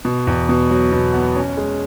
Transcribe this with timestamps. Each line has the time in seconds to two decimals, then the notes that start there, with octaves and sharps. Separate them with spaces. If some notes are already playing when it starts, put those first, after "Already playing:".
0.05 B2
0.27 E2
0.49 B2
0.70 F#3
0.92 B2
1.14 B3
1.36 C#4
1.57 G#3